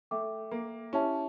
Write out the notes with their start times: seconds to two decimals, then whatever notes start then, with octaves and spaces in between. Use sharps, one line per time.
0.11 A3 A4 E5 G5 D6
0.51 A#3
0.93 C#4 E4 G4 C#5 E5 A5